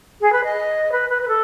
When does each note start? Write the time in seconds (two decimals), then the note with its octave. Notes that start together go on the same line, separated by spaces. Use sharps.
0.20 G#4
0.32 B4
0.43 D#5
0.91 B4
1.09 B4
1.21 B4
1.27 A4